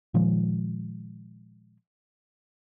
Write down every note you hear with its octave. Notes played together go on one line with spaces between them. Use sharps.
A#2 D#3 F3 G#3